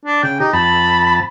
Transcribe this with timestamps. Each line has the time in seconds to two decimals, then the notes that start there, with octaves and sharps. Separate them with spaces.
0.05 D4
0.23 C#3 G5
0.40 D#4 G4
0.53 F2 A5 B5